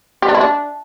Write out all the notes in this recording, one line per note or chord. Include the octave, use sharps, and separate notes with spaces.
G4
D4
E4
D4